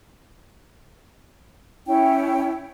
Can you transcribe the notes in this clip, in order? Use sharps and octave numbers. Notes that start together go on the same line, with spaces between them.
C#4 E4 G5